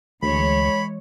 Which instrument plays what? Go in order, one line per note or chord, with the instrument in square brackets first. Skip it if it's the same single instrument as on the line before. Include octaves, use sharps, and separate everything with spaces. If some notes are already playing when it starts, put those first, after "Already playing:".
[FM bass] D2 [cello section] E3 G#3 C#5 [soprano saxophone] B5